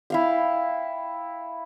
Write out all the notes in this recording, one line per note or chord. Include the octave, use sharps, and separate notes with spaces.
E4 F5 G5